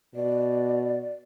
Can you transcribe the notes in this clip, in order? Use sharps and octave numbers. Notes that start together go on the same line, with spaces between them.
B2 D5